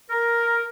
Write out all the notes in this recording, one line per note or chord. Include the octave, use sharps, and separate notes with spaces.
A#4